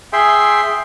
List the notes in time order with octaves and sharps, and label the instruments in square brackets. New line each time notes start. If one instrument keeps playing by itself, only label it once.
[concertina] G#4 E5 G5 C6